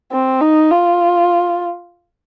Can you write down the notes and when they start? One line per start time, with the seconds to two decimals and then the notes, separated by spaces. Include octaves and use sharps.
0.12 C4
0.41 D#4
0.71 F4